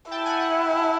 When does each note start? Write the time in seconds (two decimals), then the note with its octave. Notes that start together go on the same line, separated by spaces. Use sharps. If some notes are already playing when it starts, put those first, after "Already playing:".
0.11 E4 G5 A5
0.25 F#5 G#5
0.40 F#5 G#5